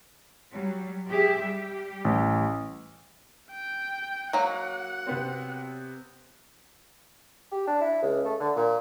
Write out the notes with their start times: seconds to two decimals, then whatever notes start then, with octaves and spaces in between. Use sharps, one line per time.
0.53 F#3 G3
1.08 G4 G#4 E5
1.42 G3 G4
2.05 A1
3.52 G5
4.33 F#3 A#3 F#5
5.06 C3 B3 C4
7.52 G4
7.67 D4
7.81 E4
8.02 C#2
8.25 A3
8.40 D3
8.56 A#2